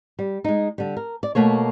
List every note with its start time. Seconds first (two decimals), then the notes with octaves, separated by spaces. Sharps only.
0.19 G3
0.44 G#3 D#4
0.78 D3 G3
0.97 A#4
1.23 D5
1.35 B2 A3 A#3 C#5